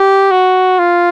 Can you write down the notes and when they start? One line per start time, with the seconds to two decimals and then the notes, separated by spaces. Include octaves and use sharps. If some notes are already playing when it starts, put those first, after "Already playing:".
Already playing: G4
0.31 F#4
0.79 F4